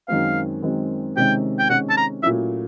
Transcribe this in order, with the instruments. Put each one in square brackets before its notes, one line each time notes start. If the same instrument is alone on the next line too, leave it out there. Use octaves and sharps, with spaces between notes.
[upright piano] F#2 D#3 G#3 C4 [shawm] F5
[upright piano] F#2 D#3 G#3 C4
[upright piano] C3 D#3 G#3 C#4 [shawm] G5
[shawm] G5
[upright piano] C3 D#3 G#3 C#4 [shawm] F#5
[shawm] A5
A#5
[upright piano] A#2 F#3 A3 C#4 E4 [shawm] E5